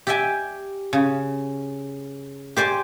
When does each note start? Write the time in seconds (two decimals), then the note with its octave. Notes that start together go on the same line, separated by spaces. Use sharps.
0.07 G4 D5 E5 G5 G#5
0.93 C#3
2.57 G4 C5 D5 G#5